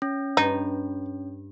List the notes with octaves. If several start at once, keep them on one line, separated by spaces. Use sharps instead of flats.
C#4
G2 D#4